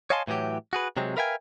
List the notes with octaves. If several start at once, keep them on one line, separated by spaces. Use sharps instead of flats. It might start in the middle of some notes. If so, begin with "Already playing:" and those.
C#5 D#5 F5 G#5 A5 C6
A2 E3 F#3 G4
F#4 G#4 B4
C3 F#3 G#3 C4
A#4 B4 E5 F5 G5 G#5